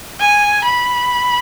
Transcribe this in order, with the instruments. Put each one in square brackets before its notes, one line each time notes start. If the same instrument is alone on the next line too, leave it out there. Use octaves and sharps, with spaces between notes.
[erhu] G#5
B5